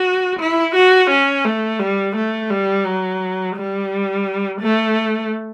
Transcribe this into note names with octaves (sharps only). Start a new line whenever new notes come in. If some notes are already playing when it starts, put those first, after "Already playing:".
Already playing: F#4
E4
F#4
C#4
A3
G3
A3
G3
F#3
G3
A3